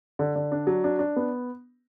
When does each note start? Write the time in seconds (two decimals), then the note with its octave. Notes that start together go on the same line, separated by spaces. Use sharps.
0.19 D3
0.36 D3
0.52 D4
0.67 F#3
0.84 D4
0.99 D4
1.16 B3